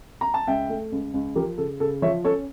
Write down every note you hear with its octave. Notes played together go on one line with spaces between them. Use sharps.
A#5
A5
C#2 E5 G5
A3
C#2
C#2
F3 G4 A#4
C#3 A4
C#3 A4
F3 C#5 E5
C#4 A4 C#5